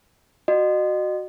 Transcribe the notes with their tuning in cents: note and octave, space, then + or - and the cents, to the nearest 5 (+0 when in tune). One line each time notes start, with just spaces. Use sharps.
F#4 +0 D#5 -35